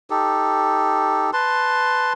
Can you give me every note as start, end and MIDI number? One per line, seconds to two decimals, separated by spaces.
0.10 1.30 63
0.10 1.30 67
0.10 1.30 69
1.33 2.13 71
1.33 2.13 81
1.33 2.13 84